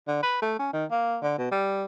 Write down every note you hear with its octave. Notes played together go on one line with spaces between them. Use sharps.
D3
B4
A3
C#4
D#3
A#3
D3
B2
G3